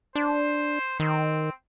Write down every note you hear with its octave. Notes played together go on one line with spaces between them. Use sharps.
D4 C5
D#3 C4